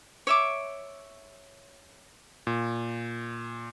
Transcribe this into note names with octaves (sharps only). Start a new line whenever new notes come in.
C#5 E5 D6
A#2